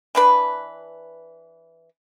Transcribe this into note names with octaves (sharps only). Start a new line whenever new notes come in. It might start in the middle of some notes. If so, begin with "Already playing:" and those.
E3 D4 B4